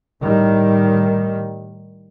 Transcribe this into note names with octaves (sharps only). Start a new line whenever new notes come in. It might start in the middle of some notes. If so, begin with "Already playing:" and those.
A2 D#3 G3